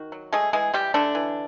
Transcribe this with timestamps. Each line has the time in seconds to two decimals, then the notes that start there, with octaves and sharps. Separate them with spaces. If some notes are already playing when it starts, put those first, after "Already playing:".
Already playing: D#3 F#4
0.12 F#3
0.32 G#3 A3 G#4
0.53 E3 G#3 G#4
0.74 E3 G3 G4
0.94 D3 A3 D4
1.15 E3